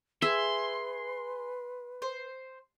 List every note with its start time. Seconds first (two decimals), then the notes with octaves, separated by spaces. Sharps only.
0.22 G#4 B4 E5 G#5 C6
2.02 C5